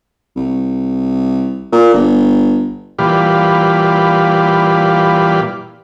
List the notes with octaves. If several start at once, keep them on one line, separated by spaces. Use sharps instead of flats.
C2
A#2
G1
A#2 E3 G3 G4 F5 B5